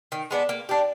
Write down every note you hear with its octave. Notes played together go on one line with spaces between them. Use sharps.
D#3
G#3 B3 D4
A#3
D4 G4